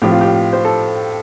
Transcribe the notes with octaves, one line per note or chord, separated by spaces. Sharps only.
A2 F3 C4 G4
F4
G4
C5
A4